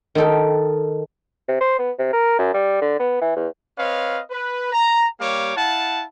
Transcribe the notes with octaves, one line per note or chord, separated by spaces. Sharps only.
D#3 D#4 A4 G5
C3
C5
B3
C3
A#4
F#2
G3
D3
B3
E3
E2
C4 B4 C#5 D#5 F5
B4
A#5
G3 A#3 G4 C#5 F5 D6
E4 F5 F#5 A5